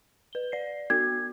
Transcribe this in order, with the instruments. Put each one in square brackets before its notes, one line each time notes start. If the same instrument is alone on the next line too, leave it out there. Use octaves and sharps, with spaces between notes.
[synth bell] B4 G7
D5 C7
[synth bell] B3 F#4 [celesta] G#6